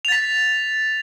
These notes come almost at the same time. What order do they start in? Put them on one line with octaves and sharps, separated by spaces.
F7 A6 B6